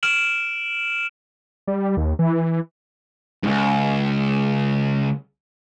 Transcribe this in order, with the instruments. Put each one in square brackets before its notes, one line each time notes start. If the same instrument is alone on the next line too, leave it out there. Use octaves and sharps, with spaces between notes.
[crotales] F6 D7 E7 F#7
[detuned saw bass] G3
D#2
E3
[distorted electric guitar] C#2 G2